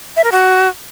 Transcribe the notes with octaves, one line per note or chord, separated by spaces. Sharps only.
E5
A#4
F#4